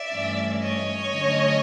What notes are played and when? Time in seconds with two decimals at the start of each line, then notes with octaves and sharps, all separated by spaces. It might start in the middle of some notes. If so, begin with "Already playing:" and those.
Already playing: D5 E5
0.13 G2 E3 A3 C#4
0.62 C#5 D#5
1.11 D3 F#3 A3 C#4